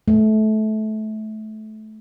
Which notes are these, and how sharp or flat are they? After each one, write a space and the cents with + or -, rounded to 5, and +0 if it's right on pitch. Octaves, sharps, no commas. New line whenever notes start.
A3 -25